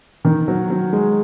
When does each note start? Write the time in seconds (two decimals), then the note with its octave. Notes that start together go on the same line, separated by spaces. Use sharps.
0.25 D#3
0.48 F#3
0.70 F#3
0.93 G#3